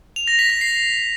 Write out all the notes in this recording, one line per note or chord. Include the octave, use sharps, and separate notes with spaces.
F7
A#6
B6
A#6
C7